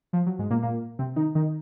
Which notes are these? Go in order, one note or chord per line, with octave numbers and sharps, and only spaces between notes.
F3
F#3
G#2 G#3
A#2 A#3
A#2 A#3
C3 C4
D#3 D#4
D#3 D#4